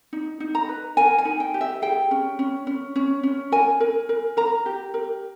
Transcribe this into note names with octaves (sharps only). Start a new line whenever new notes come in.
D#4
D#4
A#5
B4
A#4 G#5
G#5
D#4
G5
G4
E5
G#4 G5
C#4
C#4
C#4
C#4
C#4
A#4 G#5
A#4
A#4
A#4 A#5
G4
A#4